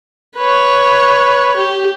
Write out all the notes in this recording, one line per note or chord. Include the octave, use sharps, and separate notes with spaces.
B4 C#5
G4